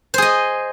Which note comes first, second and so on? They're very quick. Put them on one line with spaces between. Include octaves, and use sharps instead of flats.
C5 G#4 D#5